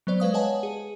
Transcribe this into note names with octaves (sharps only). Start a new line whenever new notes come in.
F#3 B3 C5 D5
G#3 B4 F5 D#6
B4 C#5 D#5 F#5 G#5 A5
G#4